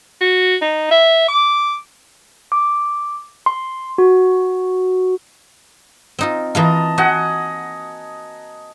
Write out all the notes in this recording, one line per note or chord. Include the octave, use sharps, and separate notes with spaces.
F#4
D#4
E5
D6
D6
C6
F#4
C4 D#4 F4
E3 A#3 F4 D#5 A5 A#5
F#4 D#5 F#5 G#5